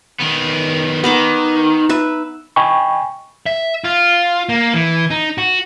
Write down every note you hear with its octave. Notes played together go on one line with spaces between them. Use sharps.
D#3 B3
D#3 B3 D#4 B5 D6
B4 E5
D#5 G5 G#5 B5 C#6
E5
F4
A#3
E3
D#4
F#4